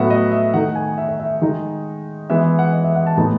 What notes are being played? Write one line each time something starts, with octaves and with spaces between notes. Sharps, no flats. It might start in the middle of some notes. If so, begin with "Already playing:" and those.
Already playing: A2 F#3 B3 E5 F#5
D#5
E5
D#3 A3 D#4 F#5
G#5
E5
E5
E5
D#3 G#3 D#4
E3 G#3 B3 E5
E5
F#5
D#5
E5
F#5
A5
A2 G#3 B3 D#4 A5